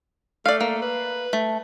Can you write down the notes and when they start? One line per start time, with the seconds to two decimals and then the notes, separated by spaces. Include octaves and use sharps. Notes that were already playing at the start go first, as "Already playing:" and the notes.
0.46 A3 D5 F5
0.61 A#3
0.82 B4
1.33 A3